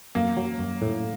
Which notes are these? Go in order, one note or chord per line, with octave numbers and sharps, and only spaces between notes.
F#2 A#3
F#3
F#2
A2